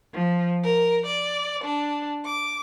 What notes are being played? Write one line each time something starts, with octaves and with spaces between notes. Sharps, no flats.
F3
A#4
D5
D4
D6